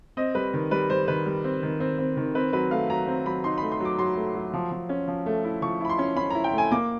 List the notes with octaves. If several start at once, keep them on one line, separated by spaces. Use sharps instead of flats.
C4 D#5
G3 B4
D#3
G3 B4
G3 C5
D#3 B4
G3
C4
D#3
C4
C4
D#3
C4 B4
F#3 B4
A3 F5
F#3 A#5
C4
F#3 B5
D#4 C6
A3 B5
C6
F#3 D6
F#3 C6
A3
F#3
F3
F3
C#4
F3
A3
E4
F3 C#6
E4 B5
C6
C#4
C#4 B5
E4 A#5
G5
A3 G#5
A#3 D6